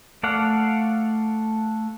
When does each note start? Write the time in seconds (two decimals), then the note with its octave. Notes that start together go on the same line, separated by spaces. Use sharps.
0.23 A3 A4 D5 F5 F#5